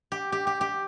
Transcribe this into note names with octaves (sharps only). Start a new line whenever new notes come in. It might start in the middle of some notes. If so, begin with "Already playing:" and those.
G4
G4
G4
G4